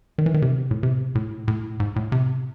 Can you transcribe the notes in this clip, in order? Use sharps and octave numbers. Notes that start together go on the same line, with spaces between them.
D#3
E3
D#3
C3
A2
C3
A2
A2
G#2
A2
C3